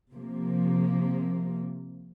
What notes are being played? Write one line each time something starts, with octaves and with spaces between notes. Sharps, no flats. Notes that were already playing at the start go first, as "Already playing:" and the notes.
C3 F3 A#3